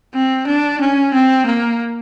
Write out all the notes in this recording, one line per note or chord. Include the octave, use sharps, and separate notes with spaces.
C4
D4
C#4
C4
A#3